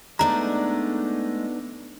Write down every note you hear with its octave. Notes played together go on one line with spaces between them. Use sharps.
G#3 A3 B3 D4 D#4 D5 A#5